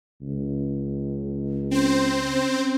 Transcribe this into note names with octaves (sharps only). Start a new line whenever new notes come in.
C#2
C4 C#4 C5